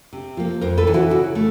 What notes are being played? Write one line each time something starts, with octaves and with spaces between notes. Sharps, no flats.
C3
F3 A#3
F2 A#4 C5
A4 B4
C3 E3
E4 F#4
C#3 E4 F#4
A3